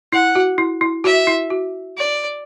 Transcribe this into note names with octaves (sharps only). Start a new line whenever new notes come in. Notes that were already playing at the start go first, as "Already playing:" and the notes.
E4 F#5
F#4
E4
E4
F#4 E5
E4
F#4
D5